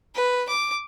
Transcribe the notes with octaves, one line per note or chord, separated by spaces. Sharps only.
B4
D6